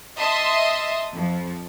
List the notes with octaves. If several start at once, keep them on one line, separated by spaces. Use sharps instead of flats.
D#5 E5 A5 C6 D#6
F2 F3